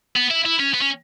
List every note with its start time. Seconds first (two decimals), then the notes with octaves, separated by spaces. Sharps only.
0.16 B3
0.31 E4
0.45 E4
0.60 C#4
0.74 B3
0.81 C#4